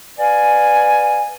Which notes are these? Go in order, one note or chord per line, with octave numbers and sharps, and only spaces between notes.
B4 D5 F5 G#5